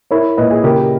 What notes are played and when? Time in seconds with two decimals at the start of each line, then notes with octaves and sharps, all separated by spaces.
0.11 E4 A#4 C#5
0.37 A#2 B4 D#5
0.51 G#4
0.64 C#3 G4 A#4